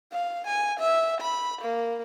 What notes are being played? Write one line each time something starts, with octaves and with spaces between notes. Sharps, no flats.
F5
G#5
E5
B5
A#3